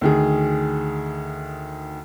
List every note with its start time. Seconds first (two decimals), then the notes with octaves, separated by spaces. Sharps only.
0.01 D2 D#3 G#4